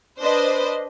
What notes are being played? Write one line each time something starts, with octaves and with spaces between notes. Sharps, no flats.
D4 B4 C5 D#5